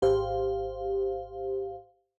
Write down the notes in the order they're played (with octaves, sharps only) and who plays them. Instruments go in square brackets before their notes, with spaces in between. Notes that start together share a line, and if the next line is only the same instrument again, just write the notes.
[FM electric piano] G#1 G4 C5 F5